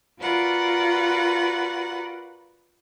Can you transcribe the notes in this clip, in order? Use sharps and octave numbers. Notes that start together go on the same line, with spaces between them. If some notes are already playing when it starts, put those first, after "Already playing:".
F4 F#4 A#4 B4 D5 F#5